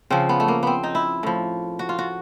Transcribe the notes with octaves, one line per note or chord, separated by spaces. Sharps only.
C#3 F3 C4
B3
A3
A#3
B3 C4
D#4
E4
A2 F3
F#4
F4
F#4